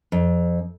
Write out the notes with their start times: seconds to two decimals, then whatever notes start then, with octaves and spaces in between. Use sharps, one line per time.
0.12 F2